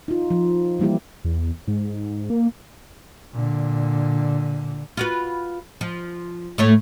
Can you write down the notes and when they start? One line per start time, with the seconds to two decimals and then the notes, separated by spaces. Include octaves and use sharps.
0.08 D#4 F4
0.31 F3
0.79 E3 G3 A#3 E4 G4
1.25 E2
1.68 G#2
2.30 A#3
3.33 A#2 D3
4.97 F4 F#4 B4
5.81 F3
6.58 A2 A3 C#5